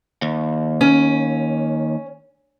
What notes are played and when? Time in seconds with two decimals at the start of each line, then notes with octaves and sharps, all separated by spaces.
0.22 D#2
0.81 C#4